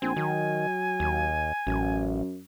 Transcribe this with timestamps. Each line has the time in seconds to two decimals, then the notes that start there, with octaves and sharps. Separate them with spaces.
0.02 A#1 C4 G#5
0.16 D#3 F#3
1.00 D#2
1.67 A1 F#2